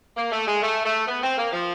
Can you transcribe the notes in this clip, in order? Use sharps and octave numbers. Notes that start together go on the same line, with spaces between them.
A#3
A3
G#3
A3
A3
B3
C4
A#3
F3